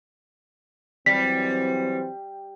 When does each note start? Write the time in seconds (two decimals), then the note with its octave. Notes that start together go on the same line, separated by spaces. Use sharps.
1.06 E3 F#3 G3 C4 B6